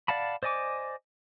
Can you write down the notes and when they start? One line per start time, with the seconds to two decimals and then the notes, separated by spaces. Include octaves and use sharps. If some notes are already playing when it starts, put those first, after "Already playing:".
0.08 D5 F5 F#5 A5 B5
0.43 C5 D5 D#5 G#5 D6